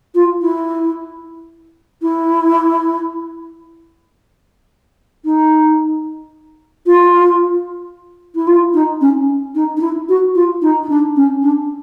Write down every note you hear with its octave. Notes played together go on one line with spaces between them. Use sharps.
F4
E4
E4
D#4
F4
E4
F4
D#4
C#4
D#4
D#4
E4
F#4
F4
D#4
D#4
D4
C#4
D4